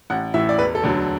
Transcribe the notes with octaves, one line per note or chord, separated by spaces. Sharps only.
A1 F#5
A2 E3 E5
D5
E1 B4
A4
D2 D3 F#3